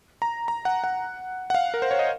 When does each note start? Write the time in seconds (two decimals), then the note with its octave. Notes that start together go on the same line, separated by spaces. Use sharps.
0.22 A#5
0.48 A#5
0.65 F#5
0.84 F#5
1.50 F#5
1.55 F5
1.74 A#4
1.82 C5
1.91 C#5
1.99 D#5